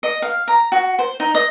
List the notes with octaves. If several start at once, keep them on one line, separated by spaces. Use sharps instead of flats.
D#5
F5
A#5
F#4
C5
D#4
D#5